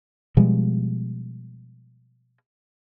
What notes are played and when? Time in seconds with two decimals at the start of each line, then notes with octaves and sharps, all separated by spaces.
0.37 B2 F3 G3 G#3